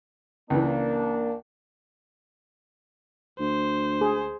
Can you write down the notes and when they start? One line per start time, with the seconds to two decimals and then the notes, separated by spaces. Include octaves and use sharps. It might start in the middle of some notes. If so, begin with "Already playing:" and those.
0.50 C#2 E3 A#3 D4
3.40 D2 C5
4.01 G#4